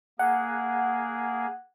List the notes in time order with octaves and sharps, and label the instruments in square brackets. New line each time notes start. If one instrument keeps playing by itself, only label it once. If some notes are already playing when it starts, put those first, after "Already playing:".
[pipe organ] A#3 G#4 [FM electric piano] F#5